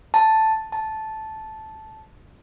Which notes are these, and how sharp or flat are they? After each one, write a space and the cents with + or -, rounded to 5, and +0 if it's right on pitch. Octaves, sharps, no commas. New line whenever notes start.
A5 +0
A5 -10